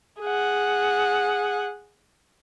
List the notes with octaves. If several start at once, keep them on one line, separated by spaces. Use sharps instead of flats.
G#4 F#5